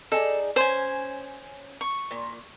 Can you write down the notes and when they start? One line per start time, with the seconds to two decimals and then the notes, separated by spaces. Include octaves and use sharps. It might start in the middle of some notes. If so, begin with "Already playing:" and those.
0.12 D#4 G#4 A4 D5
0.56 C#4 C5 G#5
1.81 C#6
2.11 A#2